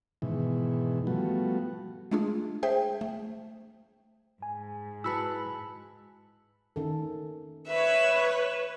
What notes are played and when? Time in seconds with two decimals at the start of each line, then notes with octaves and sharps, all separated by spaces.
0.22 G#2 B2 D#3 E3
1.07 F3 G3 A3 B3 F#4
2.11 G#3 A3 D4 F4 G#4
2.63 G#4 C5 E5 G5
3.01 A3
4.42 G#2 G#5
5.04 E4 F#4 B4 A5 B5 E6
6.76 D#3 C#4 A4
7.68 B4 C#5 E5